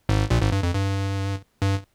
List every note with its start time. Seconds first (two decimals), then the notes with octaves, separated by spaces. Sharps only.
0.09 G#1 G#2
0.30 A#1 A#2
0.41 G#1 G#2
0.52 G2
0.63 F2
0.74 G2
1.62 G2